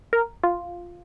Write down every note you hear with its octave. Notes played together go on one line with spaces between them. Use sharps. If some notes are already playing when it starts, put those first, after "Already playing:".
A#4
F4